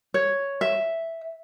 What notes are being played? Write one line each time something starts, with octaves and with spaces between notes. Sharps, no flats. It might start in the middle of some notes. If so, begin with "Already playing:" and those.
C#5
E5